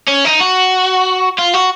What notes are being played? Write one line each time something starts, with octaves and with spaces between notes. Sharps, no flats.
C#4
D#4
F#4
F4
F#4